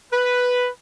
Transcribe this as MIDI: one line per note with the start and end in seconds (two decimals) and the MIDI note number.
0.12 0.68 71